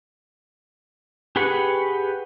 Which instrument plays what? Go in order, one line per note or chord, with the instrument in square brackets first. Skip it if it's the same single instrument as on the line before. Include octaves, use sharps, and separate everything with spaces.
[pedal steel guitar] G4 G#4 B4 F#5 C#6